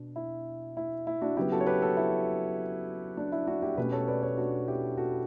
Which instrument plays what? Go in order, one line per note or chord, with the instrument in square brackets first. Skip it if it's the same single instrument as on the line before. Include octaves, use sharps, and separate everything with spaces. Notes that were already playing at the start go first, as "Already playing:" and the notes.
Already playing: [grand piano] B2 D4
E4
E4
E4
D4 F#4
C#3 F#3 B3 E4 G4
F#4 A4
C#5
G4 B4
F#4 A4
E4
D4
E4
D4 F#4
E4 G4
B2 A3 C#4 G4 B4
A4 C#5
B4 D5
A4 C#5
D4 F#4
E4 G4
F#4 A4